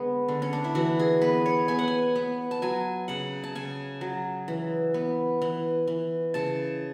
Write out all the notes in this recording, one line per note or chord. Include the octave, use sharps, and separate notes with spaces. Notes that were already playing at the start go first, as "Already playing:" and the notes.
Already playing: D3 G#3 B3 G#4
D3
C#4
D4
E4
E3 F#4
G#4
B3 B4
C#5
B3 G#5
F#5
G#5
B3
A5
F#3 G#5
C#3 F#5
A5
C#3 G#5
F#3
E3
B3
E3
E3
C#3 A5